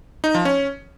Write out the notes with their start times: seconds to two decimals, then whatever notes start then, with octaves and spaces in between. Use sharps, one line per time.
0.24 D#4
0.34 F3
0.45 C#4